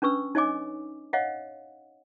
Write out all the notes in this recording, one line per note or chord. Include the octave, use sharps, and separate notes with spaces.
C#4 D4 B4 C#6 E6
D#4 C#5 D#5 G#5 D6
C#5 D#5 F5 F#5